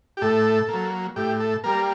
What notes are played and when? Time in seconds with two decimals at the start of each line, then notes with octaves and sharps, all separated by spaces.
0.17 G4
0.22 A2 A4
0.68 F#3 A#3
1.16 A2 G4
1.40 A4
1.64 G3 A#3 A#4